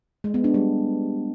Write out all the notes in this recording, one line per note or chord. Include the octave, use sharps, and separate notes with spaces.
G#3
B3
D4
G3